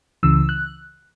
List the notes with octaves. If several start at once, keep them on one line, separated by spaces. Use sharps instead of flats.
C#2 C#3 E3 E6
F#6